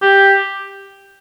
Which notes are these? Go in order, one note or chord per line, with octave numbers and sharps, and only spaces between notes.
G4